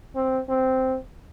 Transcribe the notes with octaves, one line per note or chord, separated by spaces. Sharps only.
C4
C4